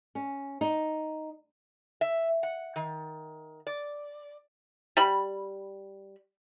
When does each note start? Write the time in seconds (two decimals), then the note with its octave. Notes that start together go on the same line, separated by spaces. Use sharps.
0.15 C#4
0.61 D#4
2.01 E5
2.43 F#5
2.76 D#3
3.67 D5
4.97 G3 B5